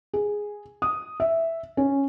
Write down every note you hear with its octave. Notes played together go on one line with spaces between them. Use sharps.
G#4
D#6
E5
C#4